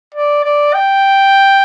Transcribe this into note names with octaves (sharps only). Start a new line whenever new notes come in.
D5
D5
G5